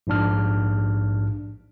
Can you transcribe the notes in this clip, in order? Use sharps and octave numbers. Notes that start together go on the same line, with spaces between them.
A#1 G#2 D4 F6